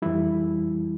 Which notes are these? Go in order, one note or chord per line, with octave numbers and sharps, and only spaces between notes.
F2 E3 G3 E4